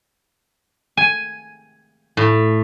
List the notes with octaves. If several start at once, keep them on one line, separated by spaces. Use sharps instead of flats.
G#5
A2